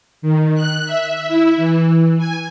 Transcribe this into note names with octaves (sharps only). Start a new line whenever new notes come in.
D#3
F#6
E5
E4
E3
G#5